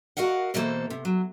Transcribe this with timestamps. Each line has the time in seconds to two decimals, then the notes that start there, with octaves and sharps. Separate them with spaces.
0.17 F#4 A#4 D#5 F5 F#5
0.54 E2 B2 E3 A#3 A4 C5
0.90 C3
1.05 F#3